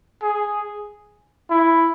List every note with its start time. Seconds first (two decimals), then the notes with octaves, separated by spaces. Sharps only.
0.22 G#4
1.50 E4